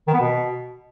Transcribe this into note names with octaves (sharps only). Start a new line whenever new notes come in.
D#3
B3
B2